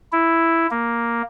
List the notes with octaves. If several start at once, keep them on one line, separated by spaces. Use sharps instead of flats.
E4
A#3